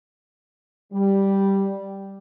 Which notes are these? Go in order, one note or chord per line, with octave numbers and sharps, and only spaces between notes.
G3